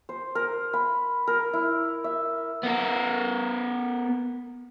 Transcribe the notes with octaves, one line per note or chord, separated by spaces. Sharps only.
C5
A#4
B5
A#4
E4
E5
B3 A#4